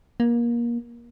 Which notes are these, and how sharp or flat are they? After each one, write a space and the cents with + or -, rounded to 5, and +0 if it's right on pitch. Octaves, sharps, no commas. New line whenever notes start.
A#3 +25